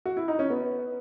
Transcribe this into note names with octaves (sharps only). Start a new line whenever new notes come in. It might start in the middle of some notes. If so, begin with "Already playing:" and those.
F#4
E4
D#4
C#4
B3